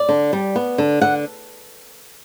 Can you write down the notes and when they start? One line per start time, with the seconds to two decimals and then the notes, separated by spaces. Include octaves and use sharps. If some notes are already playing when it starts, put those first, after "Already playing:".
Already playing: D5
0.09 D3
0.33 G3
0.56 B3
0.78 D3
1.01 D3 F#5